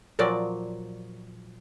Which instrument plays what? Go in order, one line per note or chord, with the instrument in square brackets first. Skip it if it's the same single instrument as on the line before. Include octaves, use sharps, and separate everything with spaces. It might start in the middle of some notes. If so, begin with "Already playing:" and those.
[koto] A#2 F3 F#3 D5